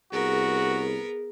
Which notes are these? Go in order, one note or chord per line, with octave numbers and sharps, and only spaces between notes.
C2 B3 F#4 G#4 A#4